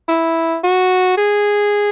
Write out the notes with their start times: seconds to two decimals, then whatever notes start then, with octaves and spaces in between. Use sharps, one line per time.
0.08 E4
0.64 F#4
1.17 G#4